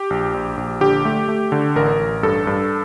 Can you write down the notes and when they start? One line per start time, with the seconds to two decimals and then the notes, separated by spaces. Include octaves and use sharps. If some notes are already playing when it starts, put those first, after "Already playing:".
Already playing: G4
0.10 A#1
0.34 A#1
0.57 A#1
0.81 D3 G4
1.05 A3
1.28 A3
1.52 D3
1.76 A1 A#4
1.99 A1
2.23 G2 A4
2.47 G2